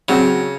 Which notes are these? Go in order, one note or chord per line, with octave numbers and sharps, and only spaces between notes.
C#3 F#3 C4 F#4